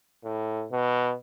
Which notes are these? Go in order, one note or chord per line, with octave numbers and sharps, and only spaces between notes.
A2
B2